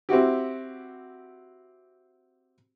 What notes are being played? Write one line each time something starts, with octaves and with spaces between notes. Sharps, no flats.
C4 E4 F#4 G4